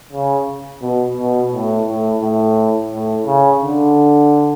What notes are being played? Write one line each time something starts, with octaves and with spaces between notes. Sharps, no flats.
C#3
B2
B2
A2
A2
A2
A2
C#3
D3